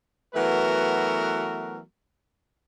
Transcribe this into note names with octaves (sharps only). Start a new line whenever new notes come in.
E3 F#3 A3 B3 F#4 A#4